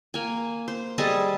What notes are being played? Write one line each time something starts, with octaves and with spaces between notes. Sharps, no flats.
A#3 G#5
C5
G3 G#4 A4 D#5